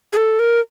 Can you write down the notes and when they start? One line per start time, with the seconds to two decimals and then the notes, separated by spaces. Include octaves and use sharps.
0.13 G#4
0.17 A4
0.39 A#4